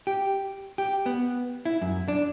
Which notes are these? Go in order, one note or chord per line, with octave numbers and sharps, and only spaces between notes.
G4
G4
B3
E4
F#2
D4